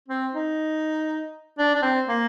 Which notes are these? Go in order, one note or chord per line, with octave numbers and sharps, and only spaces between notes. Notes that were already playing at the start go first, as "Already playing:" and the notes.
C4
D#4
D4
D4
C4
A#3